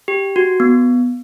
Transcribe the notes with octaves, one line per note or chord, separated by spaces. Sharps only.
G4
F#4
B3